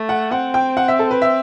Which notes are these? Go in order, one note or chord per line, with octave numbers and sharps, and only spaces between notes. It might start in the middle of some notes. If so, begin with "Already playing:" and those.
Already playing: A3
F#5
C4 F#5
G5
F#5
E5
A4
B4
E5